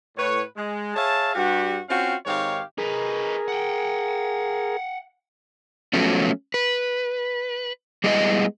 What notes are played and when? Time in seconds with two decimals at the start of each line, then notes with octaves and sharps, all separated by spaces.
0.16 A2 B4 C#5
0.56 G#3
0.95 G#4 C#5 E5 F5 A5
1.35 G2 F#4 G4
1.88 C4 C#4 F4 F#4 F5 G5
2.26 G#2 D#3 C4 G4 C#5 F5
2.78 D#4 G#4 A#4 B4
3.48 F#5 G5
5.93 F3 F#3 A3 B3 C#4
6.54 B4
8.04 G3 G#3 B3 E4 D#5